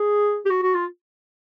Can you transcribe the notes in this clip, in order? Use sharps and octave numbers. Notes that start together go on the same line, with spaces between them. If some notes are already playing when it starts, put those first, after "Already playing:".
Already playing: G#4
G4
F#4
F#4
F4